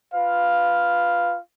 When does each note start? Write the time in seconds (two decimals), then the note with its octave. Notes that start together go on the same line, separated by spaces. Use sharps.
0.14 F4 B4 F5